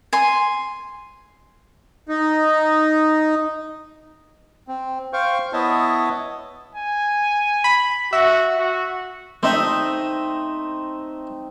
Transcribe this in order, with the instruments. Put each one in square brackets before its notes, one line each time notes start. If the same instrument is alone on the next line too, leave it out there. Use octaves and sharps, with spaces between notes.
[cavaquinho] G#5 C6
[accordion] D#4
[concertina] C4
C5 F5 G5 C#6
B3 E4 C#5 D#5 E5 A5
[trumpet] G#5
[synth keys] B5
[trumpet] F#4 [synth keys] E5
[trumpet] F#4
[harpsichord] A3 D#5 E5 [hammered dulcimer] C4 D#4